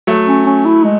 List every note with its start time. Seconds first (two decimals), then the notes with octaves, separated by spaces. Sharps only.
0.07 F#3 A3
0.27 C#4
0.46 C#4
0.65 E4
0.84 G#3